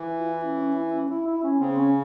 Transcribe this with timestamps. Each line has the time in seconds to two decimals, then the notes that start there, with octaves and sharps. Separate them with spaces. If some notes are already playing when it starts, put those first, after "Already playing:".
Already playing: E3
0.19 F4
0.32 E4
0.44 C#4
0.57 C#4
0.75 E4
0.92 C#4
1.10 E4
1.27 E4
1.44 C#4
1.60 C#3 C4
1.78 C#4